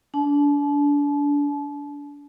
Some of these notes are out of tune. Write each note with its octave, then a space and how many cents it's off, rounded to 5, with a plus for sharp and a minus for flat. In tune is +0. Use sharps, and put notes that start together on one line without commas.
D4 -30 A5 -35